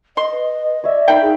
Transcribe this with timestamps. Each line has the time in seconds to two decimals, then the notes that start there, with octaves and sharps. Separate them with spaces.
0.17 D#5 C6
0.32 B4
0.84 C#5 D5 E5
1.08 D#4 A#4 F5 G5 B5
1.22 D#4 G#4